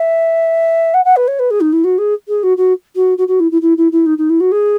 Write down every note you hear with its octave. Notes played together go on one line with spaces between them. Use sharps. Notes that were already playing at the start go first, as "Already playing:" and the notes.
Already playing: E5
F#5
F#5
B4
C#5
B4
G#4
D#4
E4
F#4
G#4
G#4
F#4
F#4
F#4
F#4
F#4
E4
E4
E4
E4
E4
D#4
D#4
E4
F#4
G#4